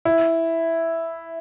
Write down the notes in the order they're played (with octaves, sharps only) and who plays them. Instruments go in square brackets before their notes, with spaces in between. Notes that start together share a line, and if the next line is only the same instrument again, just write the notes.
[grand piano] E4